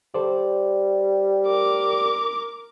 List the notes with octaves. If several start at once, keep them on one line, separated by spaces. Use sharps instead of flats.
G3 A4 C5 D5
A#4 D6